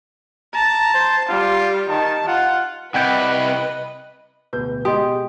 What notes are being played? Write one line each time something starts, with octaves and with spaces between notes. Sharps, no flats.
A5 A#5
C5
G3 F4
D#3 A5
F4 F#5
C2 C3 B4 D#5 F#5 G5
D1 B2 B4 G6
B2 G#3 G4 D#5 C6 D#6